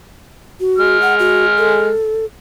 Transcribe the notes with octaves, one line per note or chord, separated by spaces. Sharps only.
F#4
G#3 F6
F#5
F#4
A4